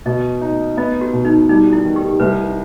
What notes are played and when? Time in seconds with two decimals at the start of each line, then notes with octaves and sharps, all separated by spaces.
0.06 B2 D#5
0.41 D#4
0.77 B3 D#5
1.01 F#4
1.13 B2
1.25 D#4
1.48 G3 D#4
1.73 E4
1.85 D#3
1.96 G4
2.20 C2 B4